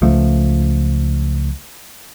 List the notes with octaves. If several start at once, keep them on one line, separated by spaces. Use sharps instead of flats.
C#2 F3 A3